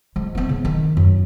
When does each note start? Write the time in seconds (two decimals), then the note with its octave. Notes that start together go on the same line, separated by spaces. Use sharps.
0.16 F3 G#3
0.35 B3 C4
0.49 C#3
0.65 D#3 D#4
0.97 F#2